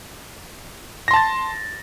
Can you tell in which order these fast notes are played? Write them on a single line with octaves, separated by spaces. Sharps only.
A#6 C6 A5 A6